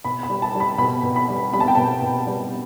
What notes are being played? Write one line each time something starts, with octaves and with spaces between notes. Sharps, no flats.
B2 B5
B5
G3
A5
G3
B5
B2 B5
B2
B5
G3
G3 B5
A5
G5
B2 A5
B2
G3